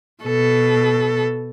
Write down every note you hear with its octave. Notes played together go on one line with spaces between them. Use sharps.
B2 A4